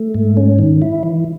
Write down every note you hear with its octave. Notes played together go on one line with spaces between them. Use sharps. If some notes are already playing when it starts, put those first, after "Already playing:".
Already playing: A3
G#2
C#4
D#3
E4
E3